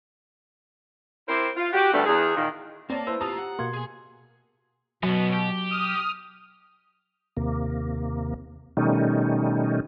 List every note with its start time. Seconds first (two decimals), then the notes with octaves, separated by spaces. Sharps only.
1.27 C4 E4 G4 A#4 C5
1.55 F4
1.73 F#4 G4
1.92 D2 G2 G3 A3 B3 D4
2.06 E2 G#4
2.35 A#2 D#3
2.90 A#3 C4 C#5 D5 A5
3.07 E4 B4 C5 E6
3.21 A#3 F4 G4 A5 A#5 D#6
3.38 F#5
3.59 B2 A#3 C6 G#6
3.73 G#4 G#5
5.03 F#2 B2 F#3 B3
5.33 G4
5.71 D#6 F6
7.37 D#2 C3 A#3
8.77 B2 D#3 G3 A3 C#4 D#4